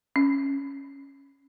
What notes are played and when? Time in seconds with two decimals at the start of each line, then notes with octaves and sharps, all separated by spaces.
0.16 C#4